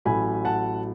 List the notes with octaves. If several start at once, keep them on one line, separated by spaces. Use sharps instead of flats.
A1 A2 F#3 G#5 B5
F#5 A5